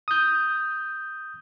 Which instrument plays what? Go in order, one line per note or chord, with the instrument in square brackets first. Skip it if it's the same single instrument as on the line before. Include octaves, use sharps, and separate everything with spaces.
[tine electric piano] D#6 G6